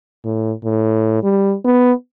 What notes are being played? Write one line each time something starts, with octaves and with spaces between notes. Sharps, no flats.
A2
A2
G3
B3